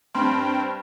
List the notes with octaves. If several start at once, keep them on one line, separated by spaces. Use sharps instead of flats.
G2 C4 G5 C6